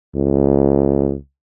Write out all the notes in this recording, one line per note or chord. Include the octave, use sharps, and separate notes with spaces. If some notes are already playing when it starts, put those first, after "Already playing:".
C#2